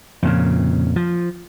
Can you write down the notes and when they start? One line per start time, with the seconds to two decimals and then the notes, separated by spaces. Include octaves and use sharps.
0.23 F2 A#2 C#3
0.96 F3